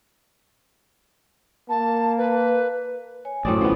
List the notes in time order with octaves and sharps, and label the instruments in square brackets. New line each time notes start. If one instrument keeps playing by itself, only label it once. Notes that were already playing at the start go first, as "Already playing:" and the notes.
[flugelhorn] A#3 [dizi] A5
[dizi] B4
[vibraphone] C#5 G#5
[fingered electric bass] A1 F#2 [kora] A2 C4 D5 [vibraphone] A3 F#4 D#6
[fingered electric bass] G1 C#4 [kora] F3 B3 [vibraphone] E4 B4